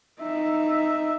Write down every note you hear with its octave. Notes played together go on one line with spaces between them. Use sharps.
D#4 E5